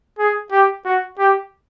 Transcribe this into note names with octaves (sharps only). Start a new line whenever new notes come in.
G#4
G4
F#4
G4